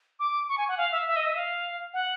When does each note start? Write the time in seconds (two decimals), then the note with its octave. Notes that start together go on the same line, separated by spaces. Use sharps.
0.19 D6
0.48 C#6
0.57 G#5
0.68 F#5
0.77 F5
0.91 E5
1.06 E5
1.16 D#5
1.26 E5
1.35 F5
1.93 F#5